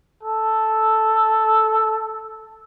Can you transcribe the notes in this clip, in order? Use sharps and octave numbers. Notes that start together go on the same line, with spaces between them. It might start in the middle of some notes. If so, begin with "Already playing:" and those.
A4